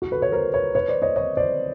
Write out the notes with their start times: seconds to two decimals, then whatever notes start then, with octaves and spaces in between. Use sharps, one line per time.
0.02 F#4
0.12 A4 B4
0.22 B4 C#5
0.32 A#4 C5
0.54 B4 C#5
0.75 B4 C#5
0.88 C5 D5
1.02 C#5 D#5
1.16 C#5 D#5
1.37 C5 D5